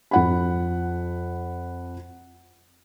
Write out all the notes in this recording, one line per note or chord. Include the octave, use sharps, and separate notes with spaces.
F2 F#5 B5